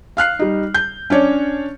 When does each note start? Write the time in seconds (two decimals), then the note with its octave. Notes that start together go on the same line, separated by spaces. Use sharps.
0.17 F5 F6 F#6 C7
0.39 G3 D#4
0.74 G6
1.10 C#4 D4 C#5 D5